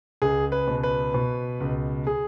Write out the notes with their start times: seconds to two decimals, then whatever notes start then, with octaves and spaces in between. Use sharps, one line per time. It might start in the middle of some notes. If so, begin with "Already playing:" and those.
0.22 C#2 G#4
0.52 B4
0.68 B2
0.83 B4
1.14 B2
1.60 C#2
2.07 G#4